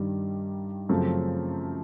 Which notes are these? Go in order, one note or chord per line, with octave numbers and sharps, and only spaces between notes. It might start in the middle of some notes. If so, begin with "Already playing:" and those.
Already playing: G2 D#3 G3
F#2 C#3 F3 A3 C4